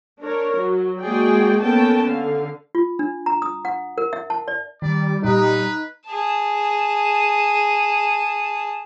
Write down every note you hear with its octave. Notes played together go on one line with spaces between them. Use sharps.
D4 A#4 C#5
F#3
G#3 A#3 F#4 G#4 D5 G5
A#3 B3 C#4 A4 G5 A5
D3 F5
F4
D4
A#5
D#6
F#5
A#4
E5
A5
D5
D#3 G3 D5
A#2 D#4 G4 B4
G#4 A5